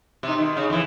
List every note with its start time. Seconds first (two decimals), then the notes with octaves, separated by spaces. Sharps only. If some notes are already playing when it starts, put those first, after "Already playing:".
0.23 C3 D#4
0.38 B2 D#3
0.57 C#3
0.70 F2 E3